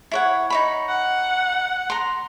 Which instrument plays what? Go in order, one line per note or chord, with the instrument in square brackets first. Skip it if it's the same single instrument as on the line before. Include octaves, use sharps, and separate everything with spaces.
[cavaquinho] E4 C#5 F#5
D#4 C#5 B5
[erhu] F#5
[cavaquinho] A#5 C6